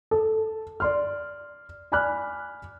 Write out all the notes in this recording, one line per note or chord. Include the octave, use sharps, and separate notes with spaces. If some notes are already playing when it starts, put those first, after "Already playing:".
A4
D5 C6 F6
D5 G#5 B5 D6 F6 F#6